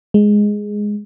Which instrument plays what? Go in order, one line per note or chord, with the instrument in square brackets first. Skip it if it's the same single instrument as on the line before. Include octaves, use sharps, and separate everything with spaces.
[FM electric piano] G#3